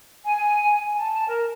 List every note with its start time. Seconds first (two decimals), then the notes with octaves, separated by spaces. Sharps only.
0.24 G#5
0.95 A5
1.28 A#4